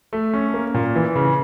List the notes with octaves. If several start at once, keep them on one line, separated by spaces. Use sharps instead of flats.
A3
C#4
A#3
A#2
E3
C#3